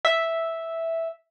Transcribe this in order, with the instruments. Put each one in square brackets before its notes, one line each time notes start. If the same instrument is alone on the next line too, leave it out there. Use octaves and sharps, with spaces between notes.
[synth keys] E5